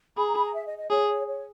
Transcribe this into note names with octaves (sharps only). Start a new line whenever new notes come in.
G#4 B5
A#5
B5
A#5
E5
D#5
D#5
G#4 C#5
C#5